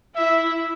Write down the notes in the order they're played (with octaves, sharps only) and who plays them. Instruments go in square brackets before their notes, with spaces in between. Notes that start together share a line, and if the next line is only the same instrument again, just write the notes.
[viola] E4 [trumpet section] E5